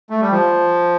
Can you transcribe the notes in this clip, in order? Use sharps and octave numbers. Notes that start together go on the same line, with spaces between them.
A3
G3
F3